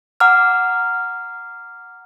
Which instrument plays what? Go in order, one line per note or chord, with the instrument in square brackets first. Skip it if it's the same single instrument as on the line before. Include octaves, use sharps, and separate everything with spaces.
[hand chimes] F#5 A#5 D6 E6 F6